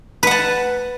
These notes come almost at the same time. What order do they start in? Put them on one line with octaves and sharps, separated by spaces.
B4 F#5 A5